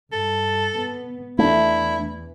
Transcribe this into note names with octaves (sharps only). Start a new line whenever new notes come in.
G2 A4
B3
E2 E3 A3 D4 E4